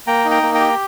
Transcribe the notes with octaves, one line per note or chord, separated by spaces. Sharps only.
A#3 G5 A#5
D#4
G5 A#5
A#3
G5 A#5
G4